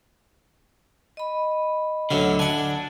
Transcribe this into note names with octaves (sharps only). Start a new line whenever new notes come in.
D#5 B5
D2 D3 F#3 C#4
D4 F#5 G#5